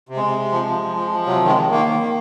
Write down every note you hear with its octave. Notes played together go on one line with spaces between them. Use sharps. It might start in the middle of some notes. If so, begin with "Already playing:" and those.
C3
G#3
C3
C3
F3
F3
F3
F3
F3
C3 F#3
D#3
G#3
D#3
D#3 A#3
D#3
D#3